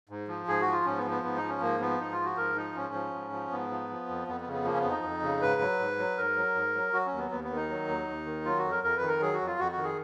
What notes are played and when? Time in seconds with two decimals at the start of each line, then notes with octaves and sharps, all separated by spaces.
0.09 G#2
0.28 F3
0.48 G#2 G#4
0.61 F#4
0.67 F3
0.72 F4
0.85 G#2 C#4
0.98 B3
1.04 F3
1.11 B3
1.23 G#2 B3
1.37 D#4
1.43 F3
1.48 C#4
1.61 G#2 A#3
1.80 F3 B3
2.00 G#2 D#4
2.12 F4
2.19 F3
2.25 F#4
2.37 G#2 A#4
2.56 F3 D#4
2.75 G#2 C#4
2.94 F3
3.14 G#2
3.32 F3
3.51 G#2 B3
3.70 F3
3.89 F3
4.08 F2
4.28 F2 B3
4.41 B3
4.47 C#3
4.53 B3
4.65 F3 A#3
4.74 C#4
4.79 B3
4.84 F2
4.91 D#4
5.03 F2
5.23 C#3
5.41 G#2 B4
5.61 F#3
5.79 G#2
5.99 F#3
6.17 G#2 A#4
6.36 F#3
6.55 G#2
6.75 F#3
6.93 F#3 F#4
7.06 C#4
7.12 D#2
7.18 B3
7.31 D#2 B3
7.44 B3
7.50 D#3
7.56 D#4
7.69 F#3
7.88 D#2
8.08 D#2
8.26 D#3
8.45 F#3 F4
8.58 F#4
8.64 F2
8.71 A#4
8.83 F2 A#4
8.96 B4
9.02 D#3
9.08 A#4
9.21 F#3 G#4
9.33 F#4
9.41 F2
9.47 F4
9.59 F2 F#4
9.72 F#4
9.78 D#3
9.84 G#4